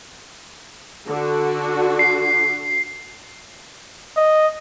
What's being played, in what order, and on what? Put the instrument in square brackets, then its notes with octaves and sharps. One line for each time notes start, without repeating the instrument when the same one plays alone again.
[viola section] D3 F#4
[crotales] C7
[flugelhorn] D#5